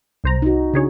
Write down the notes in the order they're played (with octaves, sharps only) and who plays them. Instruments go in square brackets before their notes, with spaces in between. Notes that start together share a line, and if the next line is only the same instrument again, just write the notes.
[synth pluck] C2 C5 A#5
[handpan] D#4 F#4
[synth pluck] C#3 G#4 C#5 [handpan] D4 F#4